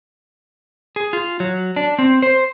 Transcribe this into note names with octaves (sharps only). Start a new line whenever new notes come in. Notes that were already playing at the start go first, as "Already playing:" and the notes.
G#4
F4
F#3
D4
C4
C5